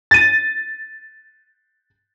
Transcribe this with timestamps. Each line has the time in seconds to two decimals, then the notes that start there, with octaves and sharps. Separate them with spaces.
0.11 A6 D#7